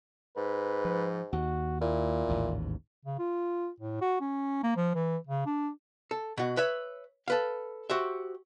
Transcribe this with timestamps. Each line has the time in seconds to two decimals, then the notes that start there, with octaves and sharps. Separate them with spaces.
0.37 G#2 B4
0.85 F3
1.33 D#2 F#4
1.81 A#2 E4
2.28 A1 D#2 G#2
3.05 C#3
3.19 F4
3.80 A2
4.01 F#4
4.21 C#4
4.63 A#3
4.77 F3
4.95 E3
5.27 C#3
5.46 D4
6.11 A4
6.37 B2 F#4
6.57 B4 C#5 E5
7.28 A4 B4 F5
7.90 F#4 G4 C5 E5